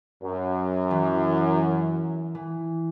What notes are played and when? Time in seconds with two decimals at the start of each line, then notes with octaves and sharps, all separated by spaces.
0.22 F#2
0.91 E3
2.35 E3